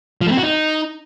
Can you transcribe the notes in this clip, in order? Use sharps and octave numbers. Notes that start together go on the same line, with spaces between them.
F3
A3
C4
F#4
D#4